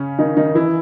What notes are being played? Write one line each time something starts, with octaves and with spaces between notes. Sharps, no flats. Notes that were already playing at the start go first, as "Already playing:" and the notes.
Already playing: C#3 C#4
D#3 D#4
D#3 D#4
E3 E4